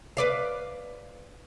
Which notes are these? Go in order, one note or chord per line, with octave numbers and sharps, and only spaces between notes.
B4 D5 F5